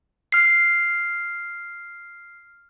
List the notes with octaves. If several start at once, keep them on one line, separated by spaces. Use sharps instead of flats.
F6 C7